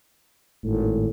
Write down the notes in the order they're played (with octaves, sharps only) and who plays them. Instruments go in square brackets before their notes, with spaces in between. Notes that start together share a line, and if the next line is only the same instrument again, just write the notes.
[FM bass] G#1 [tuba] A2